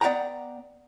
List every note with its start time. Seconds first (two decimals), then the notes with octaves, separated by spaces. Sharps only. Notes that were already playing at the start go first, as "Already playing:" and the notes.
0.01 B3 D5 E5 F#5 G5 A#5